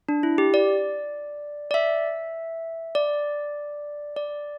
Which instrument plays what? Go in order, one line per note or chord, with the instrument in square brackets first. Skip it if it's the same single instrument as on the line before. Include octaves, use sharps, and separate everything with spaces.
[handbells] D4
E4
G4
D5
D5
E5
D5
D5